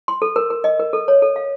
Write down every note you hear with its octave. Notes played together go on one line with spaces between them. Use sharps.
C6
A4
A#4
A#4
D#5
A#4
A4
C#5
A4
F5